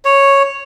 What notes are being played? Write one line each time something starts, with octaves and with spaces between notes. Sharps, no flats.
C#5